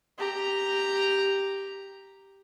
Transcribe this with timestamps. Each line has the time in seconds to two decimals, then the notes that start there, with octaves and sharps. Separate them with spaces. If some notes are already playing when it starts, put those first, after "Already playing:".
0.18 G4 A#5